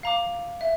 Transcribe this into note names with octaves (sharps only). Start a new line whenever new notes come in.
F5 A#5 D6
E5